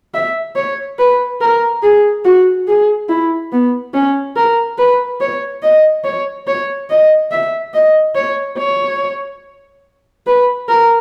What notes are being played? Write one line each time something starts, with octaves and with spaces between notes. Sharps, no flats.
E5
C#5
B4
A#4
G#4
F#4
G#4
E4
B3
C#4
A#4
B4
C#5
D#5
C#5
C#5
D#5
E5
D#5
C#5
C#5
B4
A#4